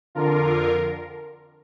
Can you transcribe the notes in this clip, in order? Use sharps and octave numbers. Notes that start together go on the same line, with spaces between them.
F2 D3 F4 A#4